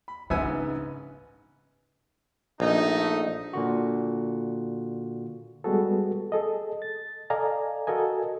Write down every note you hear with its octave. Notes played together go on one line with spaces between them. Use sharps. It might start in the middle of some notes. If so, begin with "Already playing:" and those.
B5
A#1 G#2 C#3 B3 D#4 E5 G#5
A#1 A3 D#4
A#2 D3 F#4
G3 G#3 B3 F#4 G#4 A4
G#4 A4 D#5
A6
A4 D5 D#5 F5 G#5 A#5
F#4 A4 A#4 D#5 G#5